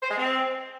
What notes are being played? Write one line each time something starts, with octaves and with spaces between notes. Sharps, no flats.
C5
G#3
C4